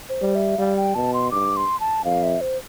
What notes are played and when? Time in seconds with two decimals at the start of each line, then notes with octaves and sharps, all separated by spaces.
0.09 C5
0.22 G3
0.35 E5
0.58 G3 F5
0.77 G5
0.95 B2 A5
1.14 C6
1.31 G2 D6
1.57 C6
1.80 A5
2.05 F2 F5
2.23 E5
2.41 C5